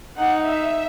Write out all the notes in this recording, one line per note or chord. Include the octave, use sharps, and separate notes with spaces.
D#4 F#5
E5